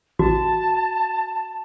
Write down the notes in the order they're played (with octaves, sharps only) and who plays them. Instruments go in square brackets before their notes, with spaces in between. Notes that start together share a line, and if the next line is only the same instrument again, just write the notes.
[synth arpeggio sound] A1 [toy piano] F#4 [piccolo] A5